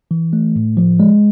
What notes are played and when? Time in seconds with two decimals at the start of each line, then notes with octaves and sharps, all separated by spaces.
0.11 E3
0.33 A3
0.56 A2
0.77 F3
1.00 G#3